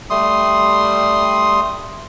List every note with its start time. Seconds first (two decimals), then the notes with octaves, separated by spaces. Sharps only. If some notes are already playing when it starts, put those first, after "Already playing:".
0.10 G3 A3 C6 D#6